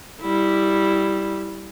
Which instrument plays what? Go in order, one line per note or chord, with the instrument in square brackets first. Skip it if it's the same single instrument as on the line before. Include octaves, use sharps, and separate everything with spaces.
[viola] G3 E4